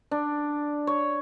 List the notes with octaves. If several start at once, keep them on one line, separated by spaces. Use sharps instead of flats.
D4
C#5